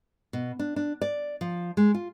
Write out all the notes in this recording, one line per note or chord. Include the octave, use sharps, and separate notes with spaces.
B2
D4
D4
D5
F3
G#3
F4